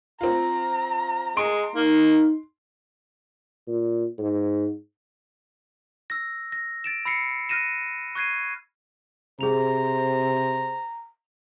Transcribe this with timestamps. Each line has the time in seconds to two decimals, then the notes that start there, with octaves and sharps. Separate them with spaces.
0.21 C4 F4 A#5
1.37 G#3 C6 D7
1.76 A#3 D#4
3.67 A#2
4.18 G#2
6.10 E6 A#6
6.52 A#6
6.84 A6 D7 E7
7.05 B5 E6 A#6 C7 C#7
7.49 F6 F#6 A#6 D#7 E7
8.15 C#6 F#6 G#6 C7 D#7
9.41 C3 G#4 C5 A#5 F7